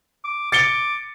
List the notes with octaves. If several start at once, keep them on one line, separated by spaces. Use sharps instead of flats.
D6
D6 A6 C#7 G7